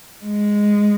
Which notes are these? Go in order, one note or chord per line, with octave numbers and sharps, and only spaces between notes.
G#3